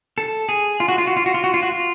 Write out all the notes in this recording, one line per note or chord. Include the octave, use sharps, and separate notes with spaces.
A4
G#4
F4
F#4
F4
F#4
F4
F#4
F4
F#4
F4
F#4
F4